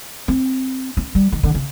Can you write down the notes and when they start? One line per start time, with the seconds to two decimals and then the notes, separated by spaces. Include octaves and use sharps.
0.28 C4
0.97 C#4
1.15 G3
1.32 D#3
1.43 D3
1.54 C#3